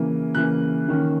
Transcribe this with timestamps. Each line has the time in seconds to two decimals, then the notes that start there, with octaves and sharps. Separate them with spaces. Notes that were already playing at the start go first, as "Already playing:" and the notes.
Already playing: C#3 E3 A#3
0.35 C#3 E3 A#3 F#6
0.88 D#3 A#3 C#4